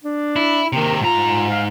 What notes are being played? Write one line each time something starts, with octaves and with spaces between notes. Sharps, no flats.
D4
E4
C3 D#3 A#3
G#2 F4 A#5
F5